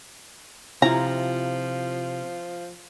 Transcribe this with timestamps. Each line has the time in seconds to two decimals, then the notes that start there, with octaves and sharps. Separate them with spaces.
0.82 C3 F3 E4 F4 A#5